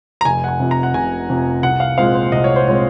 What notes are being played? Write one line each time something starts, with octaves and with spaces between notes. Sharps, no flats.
A#5
F1 G#5
F#5
G#5
F2 C3
A#5
F#5
F1 G#5
F2 C3
C2 F#5
F5
A#2 G#3 C4 F5
C5
C2 D#5
C#5
C5
A#2 G#3 C4 C#5